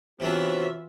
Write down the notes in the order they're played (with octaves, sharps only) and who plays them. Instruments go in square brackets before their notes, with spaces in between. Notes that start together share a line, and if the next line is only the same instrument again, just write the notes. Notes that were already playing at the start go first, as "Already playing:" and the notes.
[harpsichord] C3 B3 D4 [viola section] E3 F4 E5 [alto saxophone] F#4 [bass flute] C#5